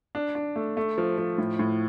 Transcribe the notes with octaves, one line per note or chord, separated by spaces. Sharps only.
D4
D4
A3
A3
F3
F3
A2
A2